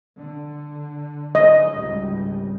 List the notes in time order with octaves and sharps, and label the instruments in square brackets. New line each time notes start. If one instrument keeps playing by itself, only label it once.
[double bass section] D3
[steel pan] D#5
[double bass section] G#1 C#2 G3